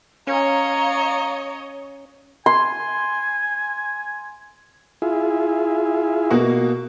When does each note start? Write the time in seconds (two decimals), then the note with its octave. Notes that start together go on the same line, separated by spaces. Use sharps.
0.27 C#4 C#5 D#5 F5 A#5
2.46 G#5 C6
5.02 E4 F4 G#4
6.30 B2 A#3 F#4